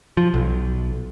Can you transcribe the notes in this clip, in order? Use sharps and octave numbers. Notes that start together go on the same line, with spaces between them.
F3
B1